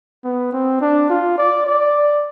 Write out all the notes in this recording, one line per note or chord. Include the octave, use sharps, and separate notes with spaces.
B3
C4
D4
F4
D5
D5